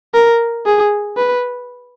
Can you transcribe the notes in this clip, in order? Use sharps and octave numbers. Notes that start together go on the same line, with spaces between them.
A#4
G#4
B4